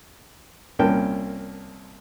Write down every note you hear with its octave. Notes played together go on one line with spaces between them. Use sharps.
C2 A#2 C#4 A#4 G5 A5